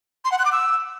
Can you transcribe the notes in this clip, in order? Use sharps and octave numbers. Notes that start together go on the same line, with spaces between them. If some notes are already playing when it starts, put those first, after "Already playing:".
C6
F#5
F#6
D6
E6